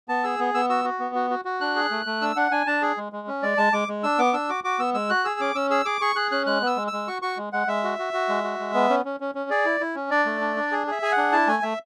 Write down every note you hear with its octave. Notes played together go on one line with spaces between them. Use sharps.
B3 A5
G#4 E6
B3
B3 E6
F#4 E6
F#4
B3
F#4
F#4
F#4
D4 F#6
G#4
A3
A3
D4 E6
D4 F#5
D4 G#5
D4 A5
G#4
G#3
G#3
C#4
G#3 D5
G#3 A5
G#3 D6
G#3
D4 E6
B3 D6
D4 E6
F#4 D6
F#4 D6
B3 E6
G#3 E6
F#4 F#6
G#4 E6
C#4 D6
C#4 E6
G#4 E6
G#4 D6
G#4 C#6
G#4 F#6
C#4 F#6
G#3 F#6
B3 E6
G#3
E6
G#3
F#4 C#6
F#4 C#6
G#3
G#3 F#5
G#3 E5
F#4
F#4
F#4
G#3
F#4
G#3
B3
C#4
C#4
C#4
C#4
G#4 D5
E4
E4
C#4
D4 D5
A3
D4
D4
G#4
G#4 E5
G#4 G#5
F#5
D4
E4 A5
A3 G#5
A3 E5